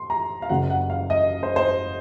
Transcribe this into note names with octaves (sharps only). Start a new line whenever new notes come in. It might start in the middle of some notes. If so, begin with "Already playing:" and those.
Already playing: C6
A#5
F5
F#1 F#2 C#3 F#5
F#5
F5
D#5
C5
C5